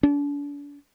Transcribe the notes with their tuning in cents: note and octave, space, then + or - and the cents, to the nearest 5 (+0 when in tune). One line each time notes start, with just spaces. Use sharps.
D4 -40